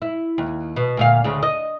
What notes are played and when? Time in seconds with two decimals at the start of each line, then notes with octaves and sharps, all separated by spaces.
0.02 E4
0.38 D#2
0.76 B2
0.97 D2 A#2 F5
1.24 D2 C#3
1.43 D#5